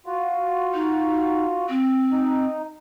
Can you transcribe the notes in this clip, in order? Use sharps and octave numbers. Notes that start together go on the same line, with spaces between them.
F4 F#4
D#4
C4
D#4